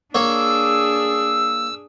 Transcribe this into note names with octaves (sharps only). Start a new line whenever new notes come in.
A#3 D4 G#4 C#5 E6